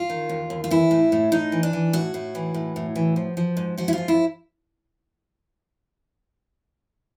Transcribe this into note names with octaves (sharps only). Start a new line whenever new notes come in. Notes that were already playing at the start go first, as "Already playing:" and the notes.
Already playing: F4
D#3
D#2
D#2
F4
E3 E4
A2
A2
A2 D#4
E3
D4
E3
A2 F#4
A2
E3
A2
A2
E3
F3
F3
G#2
F3 F#4
E4
G#2 F4
E4